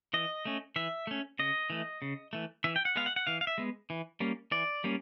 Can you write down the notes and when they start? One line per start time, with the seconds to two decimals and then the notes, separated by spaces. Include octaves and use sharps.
0.14 E3 D#5
0.45 A3 C#4
0.76 E3 E5
1.07 A3 C#4
1.39 C#3 D#5
1.70 E3 A3
2.02 C#3
2.33 E3 A3
2.64 E3 E5
2.76 G5
2.85 F#5
2.96 G#3 B3 F5
3.06 F#5
3.16 F#5
3.27 E3 F5
3.41 F5
3.47 E5
3.58 G#3 B3
3.90 E3
4.20 G3 A#3 C#4
4.52 E3 D5
4.84 G3 A#3 C#4